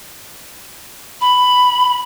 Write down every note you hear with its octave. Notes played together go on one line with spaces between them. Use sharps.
B5